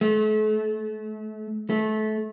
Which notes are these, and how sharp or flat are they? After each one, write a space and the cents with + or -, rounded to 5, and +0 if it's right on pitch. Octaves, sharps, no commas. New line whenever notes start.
A3 -40
A3 -25